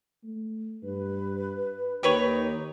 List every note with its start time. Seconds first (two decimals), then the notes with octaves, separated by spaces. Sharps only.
0.23 A3
0.83 G2 B4
2.03 D#2 D#4 G4 B4 C#5